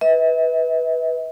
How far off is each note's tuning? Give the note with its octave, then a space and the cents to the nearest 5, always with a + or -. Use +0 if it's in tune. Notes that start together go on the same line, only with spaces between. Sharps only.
B4 -5 E5 -40